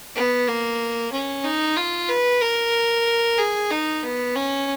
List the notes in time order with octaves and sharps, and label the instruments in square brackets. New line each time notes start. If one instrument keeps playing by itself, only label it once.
[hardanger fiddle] B3
A#3
C#4
D#4
F4
B4
A#4
G#4
D#4
B3
C#4